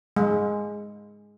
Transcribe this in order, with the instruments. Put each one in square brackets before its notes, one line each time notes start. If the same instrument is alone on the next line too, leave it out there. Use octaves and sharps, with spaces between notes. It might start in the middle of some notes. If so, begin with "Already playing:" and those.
[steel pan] G#3